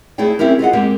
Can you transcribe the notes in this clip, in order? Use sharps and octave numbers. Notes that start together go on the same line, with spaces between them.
A3 E4 G#4 D5 G5
C4 C#4 E4 G4 A#4
F4 G#4 D#5 F#5
G#3 A#3 C4 G4 A#4